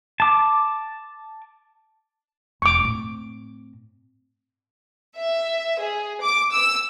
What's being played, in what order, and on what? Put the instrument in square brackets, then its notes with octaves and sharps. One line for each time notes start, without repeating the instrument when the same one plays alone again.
[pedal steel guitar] A5 D6
[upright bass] E1 [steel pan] C#6 D6
[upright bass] A2 C4
[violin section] E5
G#4
D6
E6